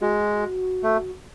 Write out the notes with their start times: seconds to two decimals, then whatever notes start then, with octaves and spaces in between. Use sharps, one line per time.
0.01 G#3 F#4
0.83 A3